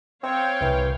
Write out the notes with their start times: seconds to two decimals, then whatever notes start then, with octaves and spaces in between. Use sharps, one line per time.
0.23 C4 C#5 F5 G5
0.61 C2 C3 E3